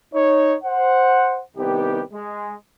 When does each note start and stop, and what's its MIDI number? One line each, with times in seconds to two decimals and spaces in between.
0.14 0.55 63
0.14 0.55 73
0.64 1.42 72
0.64 1.42 78
1.57 2.02 36
1.57 2.02 51
1.57 2.02 59
1.57 2.02 63
1.57 2.02 67
2.13 2.53 56